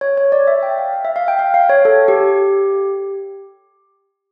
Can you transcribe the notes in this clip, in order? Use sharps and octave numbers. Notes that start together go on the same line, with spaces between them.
C#5
C#5
D5
E5
G5
F5
F5
E5
F5
G5
F5
F5
C#5
A4
G4